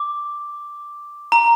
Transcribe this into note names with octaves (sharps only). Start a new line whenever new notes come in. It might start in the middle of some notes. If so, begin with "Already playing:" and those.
Already playing: D6
A#5